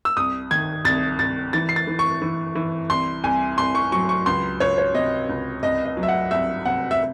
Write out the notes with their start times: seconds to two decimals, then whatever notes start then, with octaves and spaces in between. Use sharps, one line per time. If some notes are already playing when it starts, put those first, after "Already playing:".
0.05 E6
0.17 C2 D#6
0.51 D#3 G#6
0.85 C2 A6
1.19 C2 A6
1.53 E3 A6
1.69 C7
1.76 A6
1.87 E3
1.99 C#6
2.22 E3
2.55 E3
2.90 C2 C6
3.24 C2 G#5
3.58 C2 C6
3.75 C#6
3.92 F#3 C#6
4.09 C#6
4.26 C#2 C6
4.60 C#2 C#5
4.78 C#5
4.94 C3 D#5
5.29 C#2
5.63 C2 D#5
5.86 D#5
5.97 F#3
6.03 E5
6.08 F#5
6.31 C2 E5
6.65 C3 F#5
6.91 E5